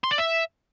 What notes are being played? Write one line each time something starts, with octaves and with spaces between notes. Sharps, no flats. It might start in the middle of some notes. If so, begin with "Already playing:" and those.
C6
D5
E5